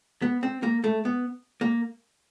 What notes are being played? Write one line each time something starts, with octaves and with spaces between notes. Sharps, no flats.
B3
C4
A#3
A3
B3
A#3